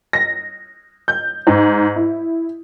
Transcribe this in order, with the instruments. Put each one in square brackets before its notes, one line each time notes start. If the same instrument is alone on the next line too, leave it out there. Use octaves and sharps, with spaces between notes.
[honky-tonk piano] A#6
G6
G#2
E4